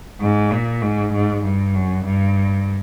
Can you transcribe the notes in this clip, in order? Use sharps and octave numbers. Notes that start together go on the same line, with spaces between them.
G#2
A#2
G#2
G#2
G2
F#2
G2